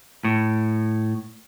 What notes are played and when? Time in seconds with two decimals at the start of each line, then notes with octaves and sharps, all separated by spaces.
0.24 A2